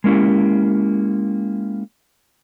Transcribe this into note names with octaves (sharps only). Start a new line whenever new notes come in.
G#3 A#3 C#4 E4 G4